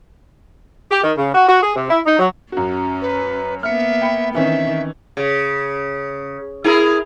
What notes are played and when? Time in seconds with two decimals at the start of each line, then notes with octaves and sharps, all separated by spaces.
0.91 G4
1.04 D#3
1.18 C#3
1.34 F#4
1.49 F#4
1.63 G#4
1.76 C3
1.90 E4
2.06 D#4
2.19 F#3
2.52 F#2 C#4 F#4
3.02 B4
3.63 A#3 B3 E5 F6 C#7
4.01 G5 B5 C#7
4.34 D#3 E3 C4 C#4 E5
5.17 C#3
6.64 E4 G#4 A#4